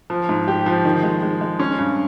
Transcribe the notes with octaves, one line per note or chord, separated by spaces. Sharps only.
F3
G#2
G4
F3
D#3
G#3
G#3
G#3
C#4
G2